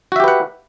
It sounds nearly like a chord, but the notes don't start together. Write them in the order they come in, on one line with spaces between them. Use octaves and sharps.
F#4 E5 G4 B4 F#5